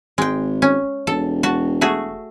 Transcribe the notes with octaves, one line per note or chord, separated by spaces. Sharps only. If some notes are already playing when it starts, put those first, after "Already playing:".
G#1 G#3 G5
C#4
E1 A4
F#4 A5
A3 F#4 G#4